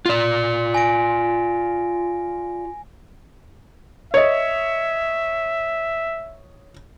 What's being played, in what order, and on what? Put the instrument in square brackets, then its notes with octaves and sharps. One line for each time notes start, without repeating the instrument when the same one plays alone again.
[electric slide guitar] F4 D5
[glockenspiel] G#5 A#6 D7
[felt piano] C#5 D#5 [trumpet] E5